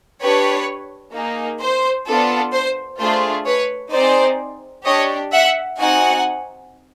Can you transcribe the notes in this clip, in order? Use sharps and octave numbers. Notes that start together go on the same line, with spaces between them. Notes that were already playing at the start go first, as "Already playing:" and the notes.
D4 G4 B4 C#5
A#3 D#4 G#4
C5
B3 D4 F4 A4
C5
A3 D4 F4 G#4 C5
B4 C#5
C4 D#4 G#4 C5 D5
D4 G4 C#5 D#5
E5 F#5
C4 D#4 F#4 F#5 G#5